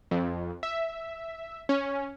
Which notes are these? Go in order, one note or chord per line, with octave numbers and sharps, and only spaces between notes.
F2
E5
C#4